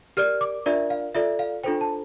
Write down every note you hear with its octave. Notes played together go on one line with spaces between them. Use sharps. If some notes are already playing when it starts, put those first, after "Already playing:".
G4 A#4 D5 F6
D6
D4 F4 A#4 D5 E5
F5
F4 A4 D5 E5
F5
D4 F4 A4 C5 G5
A5